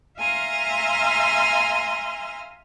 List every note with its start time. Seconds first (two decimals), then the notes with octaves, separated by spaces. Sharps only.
0.18 E5 F5 G#5 A#5 C6 F6